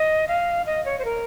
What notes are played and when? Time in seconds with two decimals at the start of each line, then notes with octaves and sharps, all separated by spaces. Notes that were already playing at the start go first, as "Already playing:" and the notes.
Already playing: D#5
0.28 F5
0.66 D#5
0.85 C#5
0.99 C5
1.05 A#4